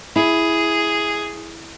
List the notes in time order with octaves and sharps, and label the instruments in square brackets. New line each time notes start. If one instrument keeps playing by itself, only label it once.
[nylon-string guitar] E4 [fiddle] G#4